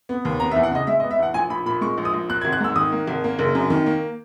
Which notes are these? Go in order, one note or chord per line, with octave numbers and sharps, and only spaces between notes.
B3
D#2
B3 A#5
E5
E2
F#5
C#3 D#5
G#3 E5
D#5
B3
E5
E2 F#5
A#1 G#5
A#1 B5
A#2 B5
G#3 C#6
A#1
D#6
A#1
A#3 F#6
G#6
G#1
F#6
G#2 E6
D#3 D#6
A#3
G#1
A#3
F#1
F#2
D#3
A#3